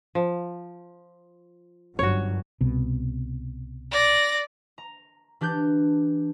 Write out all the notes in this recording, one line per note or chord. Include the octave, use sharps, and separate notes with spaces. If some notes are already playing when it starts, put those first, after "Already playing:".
F3
G1 F#2 F#4 C#5
C2 B2
D5 A#6
A#5
E3 D4 G4 F#6 G6